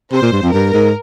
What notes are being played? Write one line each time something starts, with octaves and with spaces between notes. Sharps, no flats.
C3 C5
A#2
G2
F2
G2 A#4
G#2